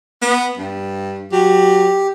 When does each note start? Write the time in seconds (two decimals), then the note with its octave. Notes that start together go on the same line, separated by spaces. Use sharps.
0.22 B3
0.58 G2
1.32 F#3 G4